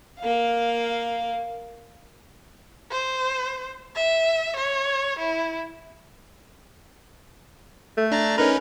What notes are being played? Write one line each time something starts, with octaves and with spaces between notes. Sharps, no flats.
A#3 F5
C5
E5
C#5
E4
A3
D4 A#5 A6
C#4 D#4 A#4 B4